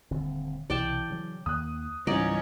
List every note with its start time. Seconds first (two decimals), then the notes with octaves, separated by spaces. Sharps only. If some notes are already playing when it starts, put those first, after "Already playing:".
0.11 D#1 D3 C4
0.70 B1 C3 E3 D5 G5 A5
1.10 C#3 F#3
1.46 D#2 D#3 A#3 D#6 F#6
2.07 C#2 G#2 E3 G3 C#4 D#4 D5 D#5